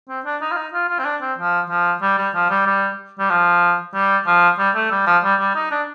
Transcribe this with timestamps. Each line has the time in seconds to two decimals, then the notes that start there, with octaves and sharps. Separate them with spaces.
0.08 C4
0.25 D4
0.41 D#4
0.52 F4
0.57 D#4
0.73 F4
0.89 F4
0.99 C4
1.05 D4
1.22 C4
1.38 F3
1.70 F3
2.02 G3
2.18 G3
2.34 F3
2.50 G3
2.66 G3
3.19 G3
3.30 F3
3.95 G3
4.27 F3
4.59 G3
4.75 A3
4.91 G3
5.06 F3
5.23 G3
5.40 G3
5.56 D#4
5.71 D4